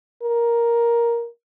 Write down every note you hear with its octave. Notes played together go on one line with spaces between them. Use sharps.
A#4